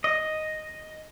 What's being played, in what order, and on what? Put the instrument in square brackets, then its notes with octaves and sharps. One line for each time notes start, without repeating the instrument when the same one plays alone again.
[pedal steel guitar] D#5